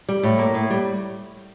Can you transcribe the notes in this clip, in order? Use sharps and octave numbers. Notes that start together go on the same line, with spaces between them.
G3
A2
A#3
A2
G3